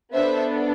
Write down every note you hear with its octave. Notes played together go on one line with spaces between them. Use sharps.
B3 D4 A4 C5 E5